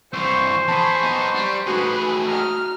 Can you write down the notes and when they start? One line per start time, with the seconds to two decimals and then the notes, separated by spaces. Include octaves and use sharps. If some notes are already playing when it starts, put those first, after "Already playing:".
0.13 C2 E3 C5 C#6
0.68 E2 G#4 A5 B5 C#6
1.03 B3 D#4
1.35 G3
1.67 A2 D#4 F#4 G#4 B4
2.28 D#5 A#5 F6